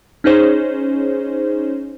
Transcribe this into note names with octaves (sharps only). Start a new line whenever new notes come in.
C#4 D#4 G#4 C5 C#5